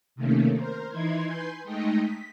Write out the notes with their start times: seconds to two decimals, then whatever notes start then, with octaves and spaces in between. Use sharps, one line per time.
0.16 C3 D#3 A3 A#3 C#4
0.57 A#4 C5
0.89 E3 D#4 E4 C6 G#6
1.27 B4 G#5 C6 G6
1.64 G#3 A3 D#4 D#5 G5
1.99 B6